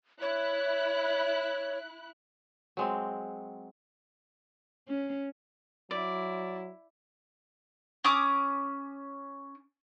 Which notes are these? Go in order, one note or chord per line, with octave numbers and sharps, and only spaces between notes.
E4 C#5 F#6
F#3 G#3 C4
C#4
F#3 E4 D5
C#4 D6 D#6